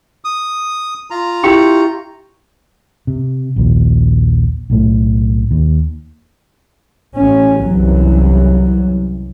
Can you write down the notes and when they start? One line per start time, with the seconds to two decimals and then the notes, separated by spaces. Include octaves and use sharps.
0.25 D#6
1.10 F4 A#5
1.43 E4 G4 C#6
3.07 C3
3.56 A#1 D#2
4.70 B1 A2 A3
5.51 D#2
7.15 A1 C#4
7.64 C2 F#2 E3 F#3